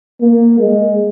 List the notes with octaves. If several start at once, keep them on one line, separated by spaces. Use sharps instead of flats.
A#3
G#3